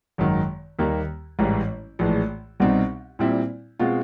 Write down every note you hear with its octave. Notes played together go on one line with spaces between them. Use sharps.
G#1 F#2 D#3
D#2 D#3 G3 A#3
A1 G#2 E3 G3
A#1 A2 E3 G#3
C2 B2 G3 C4 D#4
A#2 G3 C4 E4
B2 G#3 C4 F4